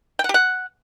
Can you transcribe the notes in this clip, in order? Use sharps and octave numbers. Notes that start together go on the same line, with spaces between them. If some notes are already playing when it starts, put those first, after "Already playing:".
G5
F#5
G4
F#5